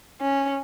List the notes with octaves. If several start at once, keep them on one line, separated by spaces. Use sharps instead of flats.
C#4